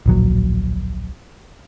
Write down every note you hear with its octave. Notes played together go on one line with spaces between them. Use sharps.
D1 A#1 F#3